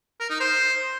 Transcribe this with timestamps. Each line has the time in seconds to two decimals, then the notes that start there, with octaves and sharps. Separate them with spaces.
0.20 A#4
0.30 D#4
0.40 C5